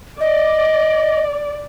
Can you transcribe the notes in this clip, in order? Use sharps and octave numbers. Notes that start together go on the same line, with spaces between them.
D5 D#5